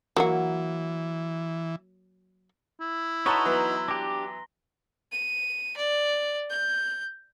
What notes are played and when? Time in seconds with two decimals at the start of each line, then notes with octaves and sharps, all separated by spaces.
0.16 E3 F#3 A#3 F#4
2.81 E4
3.26 D#4 F#4 B4 C#5 A5 A#5 C6 G7
3.45 E3 F#3 B3
3.88 D4 G4 A#6
5.12 D#7
5.77 D5
6.50 G6